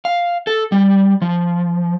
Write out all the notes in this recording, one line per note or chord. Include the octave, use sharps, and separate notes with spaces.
F5
A4
G3
F3